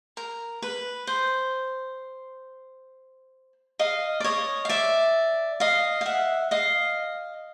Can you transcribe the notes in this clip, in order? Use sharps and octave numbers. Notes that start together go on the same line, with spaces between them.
A#4
B4
C5
D#5 F5
D5
C#5 D#5
F5
D5 E5
D#5 F5
F5
E5 F#5
D#5 F5